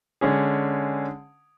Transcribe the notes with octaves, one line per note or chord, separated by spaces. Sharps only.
D3 G#3 C#4 G#4